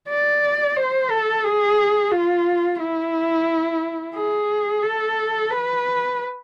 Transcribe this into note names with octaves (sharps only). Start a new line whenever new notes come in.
D5
C5
A4
G#4
F4
E4
G#4
A4
B4